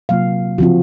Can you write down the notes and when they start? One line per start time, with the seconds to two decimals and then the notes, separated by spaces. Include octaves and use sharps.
0.09 C3 F#3 A#3 F4 F5
0.58 C#3 F3 C4 F4 F#4